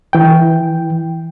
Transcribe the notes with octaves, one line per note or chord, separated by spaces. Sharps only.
E3 G5